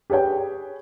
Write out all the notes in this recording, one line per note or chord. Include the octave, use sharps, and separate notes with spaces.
G4 G#4 B4 C#5 G5